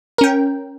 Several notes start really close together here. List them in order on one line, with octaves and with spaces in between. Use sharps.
A#4 C#4 G5